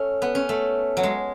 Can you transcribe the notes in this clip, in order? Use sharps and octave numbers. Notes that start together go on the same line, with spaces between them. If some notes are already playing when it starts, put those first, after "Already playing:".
Already playing: A3 C#4
B3
C#4
A3
F#3
G#3